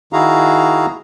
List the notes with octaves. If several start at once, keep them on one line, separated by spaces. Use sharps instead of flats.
D#3 E4 F#4 G#4 F5 A#5